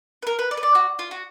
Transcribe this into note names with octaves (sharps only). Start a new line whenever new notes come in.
B4
A#4
B4
D5
B4
D5
F#4
F4
F#4